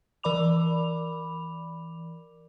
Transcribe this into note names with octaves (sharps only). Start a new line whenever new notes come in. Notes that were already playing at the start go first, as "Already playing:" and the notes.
E3 A#4 D5 B5 D6 F7